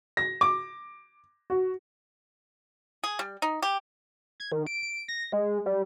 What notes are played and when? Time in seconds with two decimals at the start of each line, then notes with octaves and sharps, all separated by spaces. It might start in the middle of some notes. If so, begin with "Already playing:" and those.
0.17 A#6
0.41 D6
1.50 F#4
3.04 G#4
3.19 G3
3.42 D#4
3.62 G4
4.40 G#6
4.52 D#3
4.67 D7
4.82 D7
5.08 A#6
5.32 G#3
5.66 G3